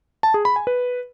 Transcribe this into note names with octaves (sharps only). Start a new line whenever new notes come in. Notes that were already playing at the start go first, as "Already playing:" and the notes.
A5
G#4
B5
G#5
B4